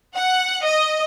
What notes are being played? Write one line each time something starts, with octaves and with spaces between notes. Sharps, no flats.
F#5
D#5